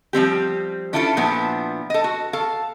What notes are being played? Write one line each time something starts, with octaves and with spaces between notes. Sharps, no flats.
F3 G3 C4 G4
C#4 D4 E4 F4 G#4 A4
A#2 F3 B3 D4 E4
A4 D#5
F#4
A4 F5